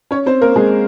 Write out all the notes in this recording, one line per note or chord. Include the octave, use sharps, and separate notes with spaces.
C#4 C#5
C4 C5
A#3 A#4
G#3 G#4